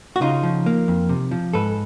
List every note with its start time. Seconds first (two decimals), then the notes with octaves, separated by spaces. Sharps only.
0.16 F#4
0.21 C#3 D#4 F4
0.43 F3
0.66 A#3
0.88 F2
1.09 C3
1.31 F3
1.53 G#2 A4 B4